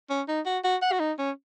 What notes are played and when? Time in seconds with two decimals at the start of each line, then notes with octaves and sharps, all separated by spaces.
0.10 C#4
0.28 D#4
0.46 F#4
0.64 F#4
0.82 F#5
0.92 F#4
1.00 D#4
1.18 C#4